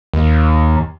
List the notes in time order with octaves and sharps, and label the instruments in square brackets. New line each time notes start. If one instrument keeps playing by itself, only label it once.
[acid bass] D#2